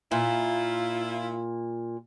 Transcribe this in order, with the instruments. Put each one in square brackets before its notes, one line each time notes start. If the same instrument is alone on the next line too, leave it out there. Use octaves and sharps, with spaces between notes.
[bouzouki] A#2 [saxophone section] E4 F4